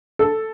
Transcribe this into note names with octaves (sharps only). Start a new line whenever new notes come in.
A4